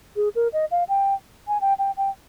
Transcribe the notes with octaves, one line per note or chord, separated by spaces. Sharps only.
G#4
A#4
D#5
F5
G5
G#5
G5
G5
G5